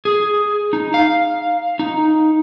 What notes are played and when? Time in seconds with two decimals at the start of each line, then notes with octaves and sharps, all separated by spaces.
0.05 G#4
0.73 D#4
0.94 F5
1.79 D#4